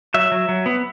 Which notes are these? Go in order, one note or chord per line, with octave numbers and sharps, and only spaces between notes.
F#3 E5
F#3
F#3
B3